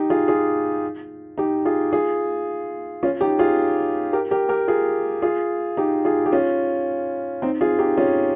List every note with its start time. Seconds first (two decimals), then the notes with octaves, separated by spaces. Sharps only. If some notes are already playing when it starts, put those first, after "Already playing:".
Already playing: D#4 G4
0.10 F4 G#4
0.28 F4 G#4
1.38 D#4 G4
1.65 F4 G#4
1.93 F4 G#4
3.03 C#4 F4
3.21 D#4 G4
3.39 F4 G#4
4.13 G4 A#4
4.31 G4 A#4
4.49 G4 A#4
4.68 F4 G#4
5.22 F4 G#4
5.77 D#4 G4
6.05 F4 G#4
6.26 G4
6.32 C#4 F4
7.42 C4 D#4
7.61 F4 G#4
7.79 D#4 G4
7.98 C#4 F4